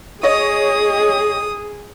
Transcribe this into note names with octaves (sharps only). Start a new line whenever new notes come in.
G#4 C#5 D#5 D#6